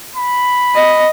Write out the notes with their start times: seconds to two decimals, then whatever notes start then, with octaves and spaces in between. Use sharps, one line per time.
0.16 B5
0.75 D#5